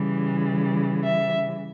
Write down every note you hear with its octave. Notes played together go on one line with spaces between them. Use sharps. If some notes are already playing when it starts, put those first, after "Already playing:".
Already playing: C#3 E3 G3
E5